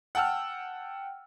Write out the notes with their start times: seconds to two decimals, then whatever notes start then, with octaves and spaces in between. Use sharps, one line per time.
0.15 F#5 G5 A5 E6 F6